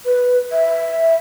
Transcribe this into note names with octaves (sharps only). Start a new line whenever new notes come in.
B4
E5